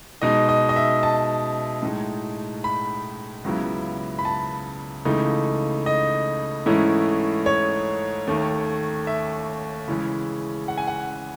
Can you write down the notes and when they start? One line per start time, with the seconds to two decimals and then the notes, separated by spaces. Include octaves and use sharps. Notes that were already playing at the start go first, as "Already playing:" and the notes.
0.22 B2 G#3 D#4 D#5
0.49 D#5
0.69 D#5
0.76 E5
1.03 A5
1.83 A2 G#3 D#4
2.64 B5
3.44 C#2 C#3 F#3 B3 E4
4.19 B5
4.25 A5
5.05 C#2 C#3 E3 A3 D#4
5.86 D#5
6.66 G#2 E3 A3 C#4 E4
7.46 C#5
8.27 D#2 D#3 A3
9.07 E5
9.88 C#3 E3 G#3 C#4
10.68 F#5
10.78 G#5
10.87 F#5